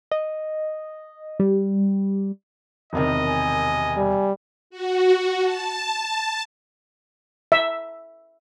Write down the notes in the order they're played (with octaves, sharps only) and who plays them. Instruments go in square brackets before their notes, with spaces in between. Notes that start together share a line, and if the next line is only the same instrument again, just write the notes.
[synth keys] D#5
G3
[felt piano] E1 C3 D#3 [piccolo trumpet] D#5
[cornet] G#5
[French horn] G3
[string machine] F#4
A5
[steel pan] E5